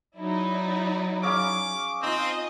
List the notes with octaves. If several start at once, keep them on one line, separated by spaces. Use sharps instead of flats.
F#3 D#4 E4 D5
C#4 G#4 F5 D6
C4 D#4 F4 D#5